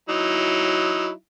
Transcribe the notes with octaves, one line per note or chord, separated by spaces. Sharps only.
F#3 D#4 E4